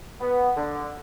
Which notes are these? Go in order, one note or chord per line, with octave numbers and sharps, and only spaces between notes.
B3
D3